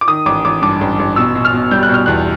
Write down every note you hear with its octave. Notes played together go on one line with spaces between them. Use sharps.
D6
D#3 D#6
A1 D6
A1 D6
G2 D6
A1
A1
B2 E6
B2
F6
B2
G3 G6
F#6
B2
F6
E2 F#6